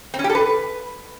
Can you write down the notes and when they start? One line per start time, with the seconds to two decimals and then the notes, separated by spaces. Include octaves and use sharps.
0.14 C4
0.19 C#4
0.24 G4
0.30 A4
0.35 B4